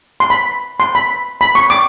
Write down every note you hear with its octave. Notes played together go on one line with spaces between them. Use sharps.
C6
B5
C6
B5
B5
C#6
D6